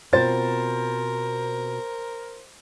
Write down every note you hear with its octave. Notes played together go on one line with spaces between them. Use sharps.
B2 C4 F4 A#4 C5 A6